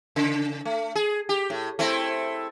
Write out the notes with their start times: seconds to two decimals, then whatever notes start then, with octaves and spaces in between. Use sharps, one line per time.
0.16 C#3
0.65 A3
0.95 G#4
1.29 G4
1.50 A2
1.79 A3 C4 E4